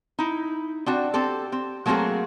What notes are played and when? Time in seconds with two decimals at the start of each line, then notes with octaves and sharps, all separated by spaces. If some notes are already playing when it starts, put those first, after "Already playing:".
0.19 D#4 E4
0.86 C4 D4 F#4
1.14 C4 G4 A4
1.52 C4
1.86 F#3 A3 A#3 C4 F#4 G#4